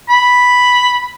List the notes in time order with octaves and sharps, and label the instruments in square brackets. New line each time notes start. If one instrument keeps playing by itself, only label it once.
[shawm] B5